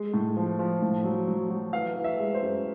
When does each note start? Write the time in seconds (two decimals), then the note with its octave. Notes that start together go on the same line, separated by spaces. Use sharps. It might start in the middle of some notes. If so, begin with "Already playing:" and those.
Already playing: G#3
0.14 A2
0.37 F3
0.59 F3
0.82 A2
1.04 F#3
1.27 F#3
1.50 F#3
1.73 E3 F5
1.96 E3
2.04 E5
2.19 G#3
2.34 C5
2.42 F#2